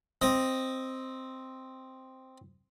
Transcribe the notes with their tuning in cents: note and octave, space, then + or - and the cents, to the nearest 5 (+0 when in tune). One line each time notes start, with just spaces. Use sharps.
C4 +0 D#5 +0